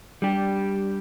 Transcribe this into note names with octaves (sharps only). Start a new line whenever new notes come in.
G3 D4 G4